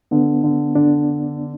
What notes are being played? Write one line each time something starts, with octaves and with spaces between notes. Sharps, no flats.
D3 B3
D3
D3 D4